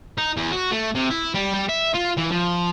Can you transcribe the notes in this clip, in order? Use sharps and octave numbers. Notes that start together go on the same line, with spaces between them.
D#4
E2
F#4
A3
C3
E4
G3
G3
E5
F4
E3
F3